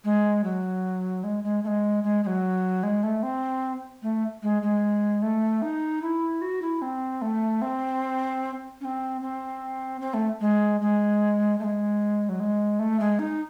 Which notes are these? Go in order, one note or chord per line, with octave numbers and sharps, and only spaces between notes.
G#3
F#3
G#3
G#3
A3
G#3
G#3
G#3
F#3
G#3
A3
C4
A3
G#3
G#3
A3
D#4
E4
F#4
E4
C4
A3
C4
C#4
C4
C4
C4
A3
G#3
G#3
A3
G#3
F#3
G#3
A3
G#3
D#4